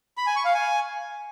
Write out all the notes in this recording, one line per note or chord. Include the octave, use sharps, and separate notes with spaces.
B5
G#5
C#6
F5
G#5